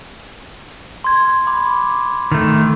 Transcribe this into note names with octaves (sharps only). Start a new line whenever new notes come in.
C6 G#6
B5 D6
D#3 A3